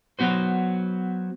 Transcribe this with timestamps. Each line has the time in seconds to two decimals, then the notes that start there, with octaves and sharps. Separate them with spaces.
0.19 F#3 B3 F#4 C5